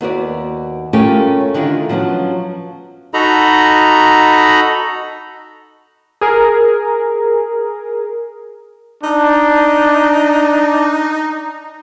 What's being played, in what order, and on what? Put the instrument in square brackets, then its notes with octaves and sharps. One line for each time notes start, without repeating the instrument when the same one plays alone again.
[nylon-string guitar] D#2 B3 F#4 D5
A3 C#4 F4 G4 A#4 G#5
D3 D#3 D4 E4 F4
F3 F#3 B3 C#4 F#4
[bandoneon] D#4 F#4 A4 D#5 A#5 B5
[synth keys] G#4 A#4
[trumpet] D4 [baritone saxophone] D#4